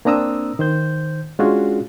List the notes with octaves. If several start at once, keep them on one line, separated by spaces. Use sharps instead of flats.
A#3 C4 D4 A#5 D#6 E6
D#3 C5 G6
G#3 C#4 D4 F4 F#4 G#4